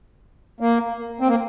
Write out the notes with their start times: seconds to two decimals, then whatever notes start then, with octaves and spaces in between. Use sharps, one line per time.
0.60 A#3
1.20 C4
1.28 A#3